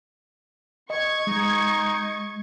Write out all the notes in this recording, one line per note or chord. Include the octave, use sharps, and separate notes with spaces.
D#5 C#6 G#6
G#3 D#4